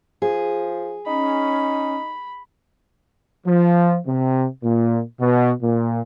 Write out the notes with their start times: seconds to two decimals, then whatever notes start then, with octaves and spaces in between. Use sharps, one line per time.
0.22 F3 G#4
1.07 C#4 D#4 B5
3.47 F3
4.07 C3
4.63 A#2
5.20 B2
5.63 A#2